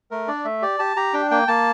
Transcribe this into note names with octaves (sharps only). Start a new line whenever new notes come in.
A3 A#4
D4 D5
A3 E5
G4 D5
G4 A5
G4 A#5
D4 G5
A#3 G5
A#3 A5